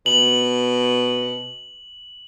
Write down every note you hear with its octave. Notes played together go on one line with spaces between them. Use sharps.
B2 F#7